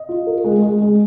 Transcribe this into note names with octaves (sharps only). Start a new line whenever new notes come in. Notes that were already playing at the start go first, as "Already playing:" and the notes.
Already playing: D#5
F4
A#4
G#3
G#3
G#3